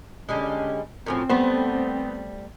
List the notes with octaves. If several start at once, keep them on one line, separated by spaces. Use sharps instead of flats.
D3 G3 G#3 C#4
F#2 A2 F3 C4
G3 A3 B3 C5